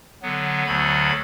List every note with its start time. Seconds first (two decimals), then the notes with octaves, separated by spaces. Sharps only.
0.22 D3 F#3 B3
0.66 D2 D3 F#3 B5